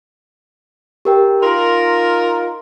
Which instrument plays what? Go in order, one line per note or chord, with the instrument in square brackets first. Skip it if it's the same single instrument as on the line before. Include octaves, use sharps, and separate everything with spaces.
[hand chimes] G4 A#4 G5
[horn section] D#4 F4 A#4 [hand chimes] C6